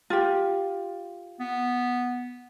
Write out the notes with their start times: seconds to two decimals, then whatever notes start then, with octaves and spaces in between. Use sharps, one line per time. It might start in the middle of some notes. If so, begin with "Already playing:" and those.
0.10 F4 G4
1.40 B3